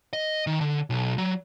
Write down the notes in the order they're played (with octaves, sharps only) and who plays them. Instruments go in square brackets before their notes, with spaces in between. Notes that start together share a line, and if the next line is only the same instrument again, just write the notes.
[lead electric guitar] D#5
D#3
D3
B1
F#3